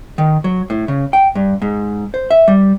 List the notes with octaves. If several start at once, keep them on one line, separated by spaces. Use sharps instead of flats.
D#3
F#3
A2
C#3
G5
G2
G#2
C5
E5
G3